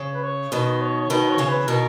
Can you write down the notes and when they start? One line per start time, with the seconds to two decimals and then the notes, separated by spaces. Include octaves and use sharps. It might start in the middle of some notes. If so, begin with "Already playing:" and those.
Already playing: C#3
0.14 B4
0.23 C#5
0.51 B2 D#3 B4
0.81 C#5
1.00 C#5
1.10 B2 D#3 B4
1.29 C#5
1.38 C#3 E3
1.48 B4
1.68 B2 D#3 A#4